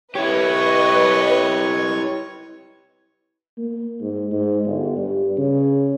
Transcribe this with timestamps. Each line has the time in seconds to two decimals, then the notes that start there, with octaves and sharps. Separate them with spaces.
0.15 E4 G4 B4 C#5 D#5 C#6
3.58 A#3
4.01 G#2
4.31 G#2
4.66 G1
4.97 G2
5.38 C#3